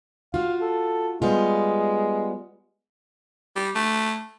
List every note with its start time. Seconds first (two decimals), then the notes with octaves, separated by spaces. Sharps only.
0.34 F4 F#4 F5
0.61 A4
1.22 G3 G#3 B3 F4
3.56 G3
3.75 A3